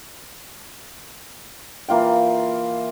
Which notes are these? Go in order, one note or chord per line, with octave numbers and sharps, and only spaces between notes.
E3 A#3 F4 G5